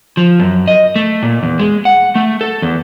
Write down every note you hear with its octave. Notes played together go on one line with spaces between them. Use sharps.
F3
F#2
D#5
A3
A#2
E2
G#3
F#5
A3
A4
E2